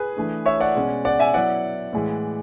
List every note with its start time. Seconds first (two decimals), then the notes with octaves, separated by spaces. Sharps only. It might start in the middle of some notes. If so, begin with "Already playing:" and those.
Already playing: G#4 B4
0.17 E3 A3 D4
0.46 C#5 E5
0.60 D5 F#5
0.75 B2 G#3 C#4
1.05 D5 F#5
1.19 E5 G#5
1.34 F#3 B3 E4 D5 F#5
1.93 A2 E3 G#3